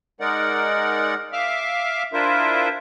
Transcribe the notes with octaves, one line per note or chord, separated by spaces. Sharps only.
G#3 D#4 A#4 D5 F#5
E5 F5 D6 F6
D4 E4 F4 A#4 C5 E5